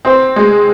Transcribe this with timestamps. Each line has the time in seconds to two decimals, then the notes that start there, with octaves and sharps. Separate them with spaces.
0.05 C4 C5
0.36 G#3